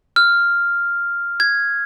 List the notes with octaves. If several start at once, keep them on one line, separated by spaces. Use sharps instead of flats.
F6
G#6